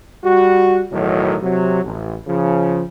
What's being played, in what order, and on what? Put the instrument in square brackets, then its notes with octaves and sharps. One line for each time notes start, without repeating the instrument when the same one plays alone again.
[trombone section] G3 F#4
B1 E2 A2 D#3 F#3
C3 F#3
A1
C#3 F3